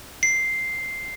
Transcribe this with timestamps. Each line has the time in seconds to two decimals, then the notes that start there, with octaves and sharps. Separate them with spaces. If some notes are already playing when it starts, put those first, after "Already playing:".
0.23 C7